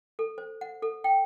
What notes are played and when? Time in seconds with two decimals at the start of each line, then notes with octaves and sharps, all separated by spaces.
0.19 A4
0.38 C5
0.61 F#5
0.82 A4
1.04 G5